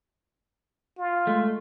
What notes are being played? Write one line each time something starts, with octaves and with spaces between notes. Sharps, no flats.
F4
G#3 A3